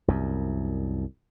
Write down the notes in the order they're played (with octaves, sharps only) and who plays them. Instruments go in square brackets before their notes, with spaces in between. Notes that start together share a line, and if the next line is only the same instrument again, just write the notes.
[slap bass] C2 F#2